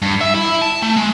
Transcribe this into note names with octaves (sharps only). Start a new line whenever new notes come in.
G2
E5
E4
A5
A3
G#3